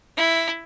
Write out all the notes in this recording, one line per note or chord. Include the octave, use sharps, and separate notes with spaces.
E4